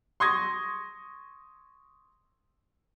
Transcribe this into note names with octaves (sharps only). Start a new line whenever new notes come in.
C6 C#6 D#6 G#6 A#6